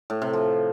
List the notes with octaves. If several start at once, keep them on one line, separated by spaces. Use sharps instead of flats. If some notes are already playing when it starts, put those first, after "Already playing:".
A2
C3
F3